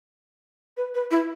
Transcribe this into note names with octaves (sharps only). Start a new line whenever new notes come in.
B4
B4
E4